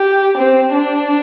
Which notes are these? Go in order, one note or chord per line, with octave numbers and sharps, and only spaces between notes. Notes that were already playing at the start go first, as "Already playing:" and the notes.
Already playing: G4
C4
D4